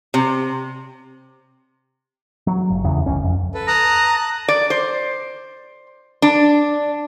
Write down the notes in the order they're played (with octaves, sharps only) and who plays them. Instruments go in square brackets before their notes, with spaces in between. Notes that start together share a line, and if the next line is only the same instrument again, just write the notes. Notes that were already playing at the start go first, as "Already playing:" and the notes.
[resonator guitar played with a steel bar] C3
[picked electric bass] F#3
G1
F1 E2 C#3
G1 C#2 C#4
F2
[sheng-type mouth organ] A4 B4
[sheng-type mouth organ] A5 D#6 F#6 [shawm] A#5
[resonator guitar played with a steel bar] D5
C5
D4